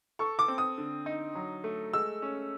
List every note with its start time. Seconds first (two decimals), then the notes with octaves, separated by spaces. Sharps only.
0.19 A4 C#6
0.39 D6
0.48 C4
0.58 D#6
0.78 D3
1.06 D#4
1.35 F#3
1.64 A3
1.93 G#3 E6
2.22 C#4